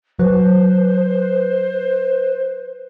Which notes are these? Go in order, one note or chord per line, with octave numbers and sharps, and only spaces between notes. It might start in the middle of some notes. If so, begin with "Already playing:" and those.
F#3 B4 C5